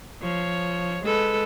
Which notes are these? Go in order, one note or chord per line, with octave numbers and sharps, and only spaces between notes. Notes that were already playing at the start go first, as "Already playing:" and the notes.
F3 C#5
G#3 A4 B4